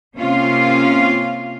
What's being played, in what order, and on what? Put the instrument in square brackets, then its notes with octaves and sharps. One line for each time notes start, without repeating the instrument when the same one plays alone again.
[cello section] C3 A#3 C#4 F4 F5